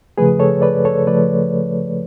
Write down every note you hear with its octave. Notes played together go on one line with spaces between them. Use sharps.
C#3 F3 A3 G#4 B4
A4 C#5
B4 D5
A4 C#5
C#3 F3 A3 B4 D5